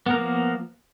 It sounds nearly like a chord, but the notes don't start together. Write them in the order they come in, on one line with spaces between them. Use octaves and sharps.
B3 A#4 A#3 F3